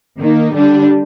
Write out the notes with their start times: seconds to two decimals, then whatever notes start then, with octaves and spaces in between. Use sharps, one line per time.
0.20 D#3 A#3 D#4
0.53 D3 G3 D4